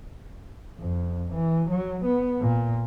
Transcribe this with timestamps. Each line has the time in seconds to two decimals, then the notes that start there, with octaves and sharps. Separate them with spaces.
0.79 F2
1.33 E3
1.70 F#3
2.05 B3
2.41 A#2